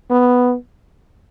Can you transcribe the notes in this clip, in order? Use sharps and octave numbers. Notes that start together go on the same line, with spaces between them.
B3